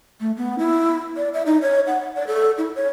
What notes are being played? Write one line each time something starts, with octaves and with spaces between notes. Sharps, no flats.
A3
B3
E4
D5
E5
D#4
C#5
F#5
D5
A4
E4
C#5